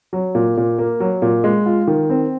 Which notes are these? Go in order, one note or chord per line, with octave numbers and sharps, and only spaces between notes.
F#3
A#2
A#2
A#3
F#3
A#2
G#3
F4
D#3
C4